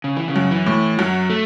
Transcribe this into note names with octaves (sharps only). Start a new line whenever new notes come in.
C#3
E3
C#3
F#2
E3
A2
F#2 F#3
A3